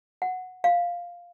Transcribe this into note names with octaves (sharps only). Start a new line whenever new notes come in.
F#5
F5